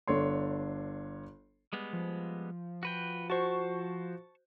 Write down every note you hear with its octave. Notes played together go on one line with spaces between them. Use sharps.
G1 D4 A4 C#5 C6
G3 G#3 B3
F3
F#4 B4 G5
F#4 C5 A5 C#6